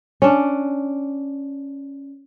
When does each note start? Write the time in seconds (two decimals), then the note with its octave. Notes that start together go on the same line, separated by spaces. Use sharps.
0.22 C#4 D4